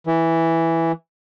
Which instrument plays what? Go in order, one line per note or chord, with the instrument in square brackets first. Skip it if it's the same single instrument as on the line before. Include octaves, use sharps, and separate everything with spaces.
[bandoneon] E3